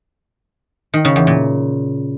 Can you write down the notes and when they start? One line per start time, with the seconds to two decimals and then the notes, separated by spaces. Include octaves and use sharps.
0.94 D#3
1.05 C#3
1.16 E2
1.27 A#2